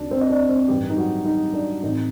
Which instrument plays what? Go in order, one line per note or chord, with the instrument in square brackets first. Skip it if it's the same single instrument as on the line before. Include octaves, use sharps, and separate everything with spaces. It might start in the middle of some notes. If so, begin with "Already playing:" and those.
Already playing: [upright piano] D2 C3 D#3 D4
C4 C5
D#5
D4 D5
C4 C5
A1 G2 D#3 G3 G4
D#4
F#3 F#4
D#4
D4
A1 A2 A3 C4 D#4